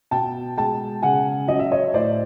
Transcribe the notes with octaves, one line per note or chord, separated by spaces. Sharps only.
B2 G5 A5
G#3 G5 A5
C#3 F#5 G#5
F#3 D#5
E5
C#5 D#5
A2 C5 D5